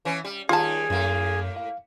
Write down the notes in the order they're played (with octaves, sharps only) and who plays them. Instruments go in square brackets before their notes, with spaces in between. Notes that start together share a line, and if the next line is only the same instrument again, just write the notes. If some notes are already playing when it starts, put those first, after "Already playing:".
[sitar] E3 C#4
G3
[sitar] D#2 G3 D#4 [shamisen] F4 A5 [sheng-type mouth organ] G#4
[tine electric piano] F#2 [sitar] A2 A#3
[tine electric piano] F5